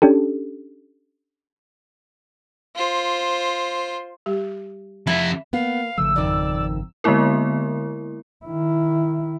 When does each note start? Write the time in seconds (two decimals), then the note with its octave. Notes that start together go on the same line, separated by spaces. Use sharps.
0.02 C#4 D4 G4 A4
2.76 F4 C5
4.26 G3 G4
5.07 F2 E4 E5
5.53 A#3 B3 F5
5.98 G#1 C#3 F3 A3 E6
6.16 F2 D#3 D5
7.04 D3 G#3 A#3 B3 E4 A#4
8.45 D#3 E4